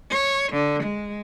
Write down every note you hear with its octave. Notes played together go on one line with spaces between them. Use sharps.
C#5
D3
G#3